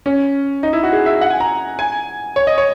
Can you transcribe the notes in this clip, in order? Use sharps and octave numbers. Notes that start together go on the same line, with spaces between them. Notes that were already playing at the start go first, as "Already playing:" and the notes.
C#4
D#4
E4
F#4
G#4
E5
F#5
G#5
A#5
G#5
C#5
D#5
C#5